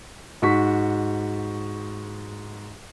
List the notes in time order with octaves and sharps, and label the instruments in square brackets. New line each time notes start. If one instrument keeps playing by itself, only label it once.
[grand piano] G#2 F#4 C#6 B6